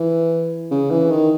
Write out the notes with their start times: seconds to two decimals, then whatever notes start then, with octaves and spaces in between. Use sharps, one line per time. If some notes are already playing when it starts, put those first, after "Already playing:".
Already playing: E3
0.71 C#3
0.91 E3
1.11 D#3